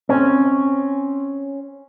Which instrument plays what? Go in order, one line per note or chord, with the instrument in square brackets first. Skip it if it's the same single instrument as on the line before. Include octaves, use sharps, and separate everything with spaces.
[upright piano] C4 [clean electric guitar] C#4